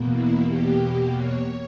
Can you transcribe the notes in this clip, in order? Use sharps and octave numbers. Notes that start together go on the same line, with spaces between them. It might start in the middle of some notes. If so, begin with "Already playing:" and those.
Already playing: E2 B2 A#3
E4
G4
C#5